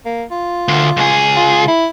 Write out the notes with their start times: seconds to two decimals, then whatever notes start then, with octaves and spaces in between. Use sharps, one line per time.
0.05 A#3
0.31 F4
0.68 D2
0.97 C#2 G#4
1.36 F4
1.67 E4